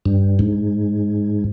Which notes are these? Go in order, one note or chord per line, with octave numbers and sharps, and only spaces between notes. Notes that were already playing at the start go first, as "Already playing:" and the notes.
G2
G#2